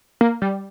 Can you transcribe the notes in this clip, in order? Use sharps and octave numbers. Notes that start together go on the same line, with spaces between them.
A#3
G3